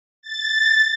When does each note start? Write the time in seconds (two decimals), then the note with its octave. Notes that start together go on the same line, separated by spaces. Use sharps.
0.22 A6